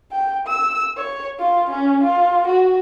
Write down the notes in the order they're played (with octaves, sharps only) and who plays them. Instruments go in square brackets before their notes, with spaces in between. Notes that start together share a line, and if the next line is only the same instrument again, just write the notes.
[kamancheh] G5
E6
C#5
F4
C#4
F4
F#4